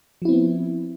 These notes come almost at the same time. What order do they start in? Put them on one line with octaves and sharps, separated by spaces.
F3 E4 C4 B3